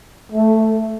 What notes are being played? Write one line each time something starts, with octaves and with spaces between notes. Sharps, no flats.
A3